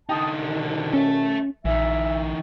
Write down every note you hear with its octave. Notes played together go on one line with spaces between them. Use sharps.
D3 D#4 G5 A5 D#6
C2 B2 D#3
C#4 A4 E5
A#1 E3 D#4 E5